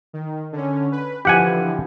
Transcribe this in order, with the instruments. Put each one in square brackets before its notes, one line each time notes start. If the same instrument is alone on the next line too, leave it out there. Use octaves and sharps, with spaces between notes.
[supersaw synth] D#3
D3 C#4
B4
[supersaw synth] D3 E3 F3 [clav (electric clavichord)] G4 F#5 G#5